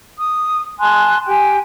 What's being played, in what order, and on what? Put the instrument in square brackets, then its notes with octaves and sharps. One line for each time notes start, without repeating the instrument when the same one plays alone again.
[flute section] D#6
G#5 A5 C6 F#6
G4 G5 G#5